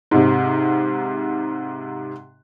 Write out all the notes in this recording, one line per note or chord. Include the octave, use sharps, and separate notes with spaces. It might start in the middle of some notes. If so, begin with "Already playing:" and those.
G#2 C3